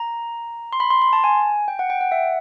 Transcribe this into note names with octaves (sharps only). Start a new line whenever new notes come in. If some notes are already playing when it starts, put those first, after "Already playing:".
Already playing: A#5
C6
B5
C6
C6
A5
G#5
G5
F#5
G5
F#5
E5